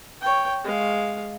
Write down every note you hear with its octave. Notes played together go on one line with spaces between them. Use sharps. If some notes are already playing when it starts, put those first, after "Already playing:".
C#5 G5
G#3 F5